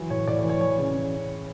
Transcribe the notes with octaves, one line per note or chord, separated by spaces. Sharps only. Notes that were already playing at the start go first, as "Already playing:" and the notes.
Already playing: E3 F#3
A2 C#5
A2 D5
C#5
E3
C#5
E3 C#5
C#3
C#3